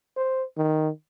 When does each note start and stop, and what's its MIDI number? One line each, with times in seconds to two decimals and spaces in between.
0.17 0.43 72
0.57 0.89 51